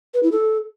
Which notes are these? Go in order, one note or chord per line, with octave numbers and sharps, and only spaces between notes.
B4
E4
A4